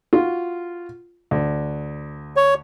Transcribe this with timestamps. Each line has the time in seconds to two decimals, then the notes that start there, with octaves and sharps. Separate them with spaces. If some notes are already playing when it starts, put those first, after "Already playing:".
0.13 F4 F#4
1.31 D2
2.36 C#5